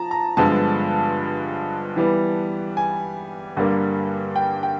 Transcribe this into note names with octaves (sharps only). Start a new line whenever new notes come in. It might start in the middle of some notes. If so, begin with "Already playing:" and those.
Already playing: F3 A5 A#5
A#5
G2 D3 F3 G#3 B3 A5
E3 G3 B3
G#5
G2 D3 G3 A#3
G5
G5